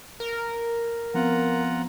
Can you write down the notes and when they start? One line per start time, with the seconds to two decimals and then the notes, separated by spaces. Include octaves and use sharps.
0.20 A#4
1.14 F3 B3 C4 F4 F#5 A#5